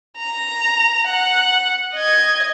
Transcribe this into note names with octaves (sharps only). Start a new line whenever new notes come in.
A#5
F#5
D#5 G#6